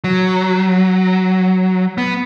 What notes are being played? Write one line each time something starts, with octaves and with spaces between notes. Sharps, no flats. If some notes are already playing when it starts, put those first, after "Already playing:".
F#3
B3